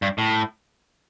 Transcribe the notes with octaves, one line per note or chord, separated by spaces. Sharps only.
G2
A2